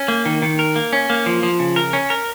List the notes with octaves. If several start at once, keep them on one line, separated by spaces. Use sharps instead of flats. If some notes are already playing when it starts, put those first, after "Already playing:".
Already playing: C#4
A#3
D#3
D#3
A#4
A#3
C#4
A#3
F3
F3
C#3
A#4
C#4
A#4